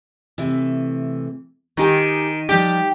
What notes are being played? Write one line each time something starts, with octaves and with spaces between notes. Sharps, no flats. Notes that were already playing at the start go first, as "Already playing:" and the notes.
C3 E3 A3
D#3 D#4 G4 G#5
F3 G3 G4